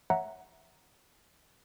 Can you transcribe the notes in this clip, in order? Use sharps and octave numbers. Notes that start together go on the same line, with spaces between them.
C#5 E5 F#5 A#5